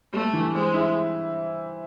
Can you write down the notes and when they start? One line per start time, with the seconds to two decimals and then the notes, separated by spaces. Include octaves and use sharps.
0.13 G3 A3
0.33 E3
0.54 G#3 C4
0.74 E4